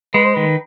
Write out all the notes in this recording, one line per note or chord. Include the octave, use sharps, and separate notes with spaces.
G#3 B4
C5
D#3 B4